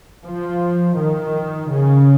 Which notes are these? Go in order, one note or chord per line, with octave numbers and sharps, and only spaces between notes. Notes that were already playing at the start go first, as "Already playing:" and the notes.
F3
D#3
C#3